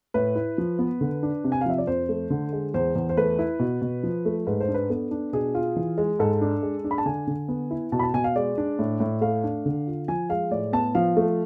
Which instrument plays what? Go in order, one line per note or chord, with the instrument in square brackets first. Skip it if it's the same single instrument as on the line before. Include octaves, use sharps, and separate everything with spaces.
[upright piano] A2 B4
E4
F3
B3
D3
D4
C3
G#5
F5
F3 E5
D5
F2 C5
A3
D3
G#3
E2 C5
E2
C5
A3 B4
E4
B2
B2
F3
A3
G#2 B4
C5
D4
B4
B3 A4
D4
B2 G#4
F4
E3
G#3
G#2 A4
D4
G#3
D4
B5
A5
D3 G#5
D3
B3
E4
B2 A5
B5
A5
B2 G#5
F5
G#3 D5
D4
A2
A2
A3 F5
D4
D3
F4
F3 G#5
G#3 F5
A2 D5
B3 A5
F3 F5
A3